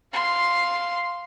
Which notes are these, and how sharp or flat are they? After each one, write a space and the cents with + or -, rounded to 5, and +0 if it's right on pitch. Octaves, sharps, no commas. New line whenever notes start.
F5 +0 C6 +0